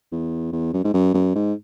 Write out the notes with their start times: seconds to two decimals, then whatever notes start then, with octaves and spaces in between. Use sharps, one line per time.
0.12 E2
0.52 E2
0.73 F#2
0.84 G#2
0.94 F#2
1.14 F#2
1.35 G#2